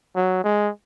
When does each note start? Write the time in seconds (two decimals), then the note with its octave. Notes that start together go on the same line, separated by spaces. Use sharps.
0.16 F#3
0.44 G#3